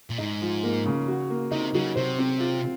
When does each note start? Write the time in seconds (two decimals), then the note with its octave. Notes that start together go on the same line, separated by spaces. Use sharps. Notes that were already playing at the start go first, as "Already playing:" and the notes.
0.10 A#2
0.18 G#2 D#4
0.42 F3
0.63 A#3
0.86 C#3
1.08 F#4
1.30 A#3
1.51 C3 D#4
1.75 C#3 F#3
1.96 C3 C5
2.19 C4
2.40 F4